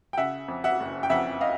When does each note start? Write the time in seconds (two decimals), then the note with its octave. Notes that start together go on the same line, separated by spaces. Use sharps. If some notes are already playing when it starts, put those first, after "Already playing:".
0.13 G5
0.17 C#3 E5 F#5
0.48 F2
0.64 E5 F#5
0.80 F#1
1.03 G5
1.10 F2 E5 F#5
1.41 D#5 F5